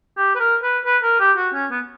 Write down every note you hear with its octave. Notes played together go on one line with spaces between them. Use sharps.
G4
B4
A#4
B4
B4
A#4
G4
F#4
C#4
B3